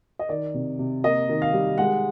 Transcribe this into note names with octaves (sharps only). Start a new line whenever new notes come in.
D#5
D#3 D5
C3
C3
A#3 D#5
D#3
F5
G3
G#3 F#5